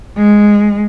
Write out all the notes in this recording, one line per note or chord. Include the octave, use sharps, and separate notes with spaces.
G#3